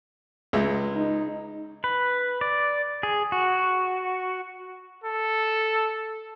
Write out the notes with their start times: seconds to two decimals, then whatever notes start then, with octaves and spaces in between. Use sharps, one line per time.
0.53 C#2 G#3 E5
0.96 D#4
1.84 B4
2.41 D5
3.03 G#4
3.32 F#4
5.04 A4